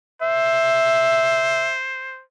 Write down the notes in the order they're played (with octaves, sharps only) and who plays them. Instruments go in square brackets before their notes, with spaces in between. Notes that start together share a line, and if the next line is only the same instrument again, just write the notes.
[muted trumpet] C5 [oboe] E5